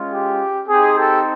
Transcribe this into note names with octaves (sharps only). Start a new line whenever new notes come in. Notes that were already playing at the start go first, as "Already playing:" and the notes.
Already playing: G#3 C#4 F4
G4
C4 D#4 G4 G#4
G4 A4